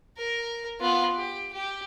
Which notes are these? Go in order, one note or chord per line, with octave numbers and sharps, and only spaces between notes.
A#4
B3 F4
G4
G4